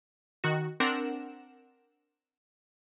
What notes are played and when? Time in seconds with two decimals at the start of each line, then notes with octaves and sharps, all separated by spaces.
0.44 D#3 F#4
0.80 C4 D4 A#4 F#5 E7